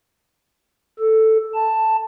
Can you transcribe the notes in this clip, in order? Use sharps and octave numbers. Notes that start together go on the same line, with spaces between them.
A4
A5